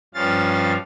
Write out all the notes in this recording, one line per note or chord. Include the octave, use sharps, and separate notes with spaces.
G2 F3 C#4 F5 A6